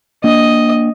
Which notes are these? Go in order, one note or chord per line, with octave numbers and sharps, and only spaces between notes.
A#3 D4 D#5